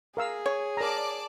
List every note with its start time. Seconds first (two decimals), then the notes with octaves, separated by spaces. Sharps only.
0.17 G#4 A#4 F5 E6
0.46 C#5
0.77 A#4 D5 A5 A#5 D6